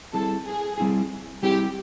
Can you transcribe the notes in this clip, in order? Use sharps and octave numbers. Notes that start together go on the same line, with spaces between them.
G3 C4 E4 G#4 A4
G#4
G3 C4 E4 G#4
G3 C4 E4 G4 G#4